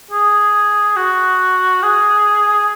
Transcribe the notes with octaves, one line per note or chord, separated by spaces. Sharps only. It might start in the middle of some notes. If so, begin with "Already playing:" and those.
G#4
F#4
G#4